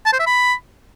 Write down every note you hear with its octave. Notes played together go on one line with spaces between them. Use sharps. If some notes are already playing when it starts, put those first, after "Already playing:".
A5
C5
E5
B5